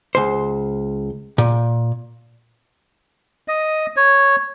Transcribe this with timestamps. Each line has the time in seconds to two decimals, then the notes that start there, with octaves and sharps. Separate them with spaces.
0.15 C#2 C5
1.38 A#2
3.48 D#5
3.96 C#5